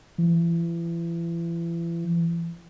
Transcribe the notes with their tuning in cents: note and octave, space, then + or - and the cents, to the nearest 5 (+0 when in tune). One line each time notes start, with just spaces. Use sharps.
E3 +35